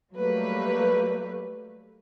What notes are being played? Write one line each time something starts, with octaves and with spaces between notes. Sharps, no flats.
F#3 G3 A3 A#3 B4